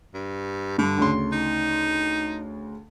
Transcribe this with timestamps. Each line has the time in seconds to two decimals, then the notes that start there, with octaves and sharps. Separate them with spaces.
0.14 G2
0.78 G2 D3
0.98 D2 C#3 C6
1.32 D#4